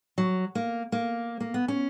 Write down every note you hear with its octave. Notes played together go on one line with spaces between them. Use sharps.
F#3
A#3
A#3
A#3
B3
C#4